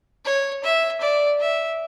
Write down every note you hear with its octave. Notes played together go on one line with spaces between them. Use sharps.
C#5
E5
D5
E5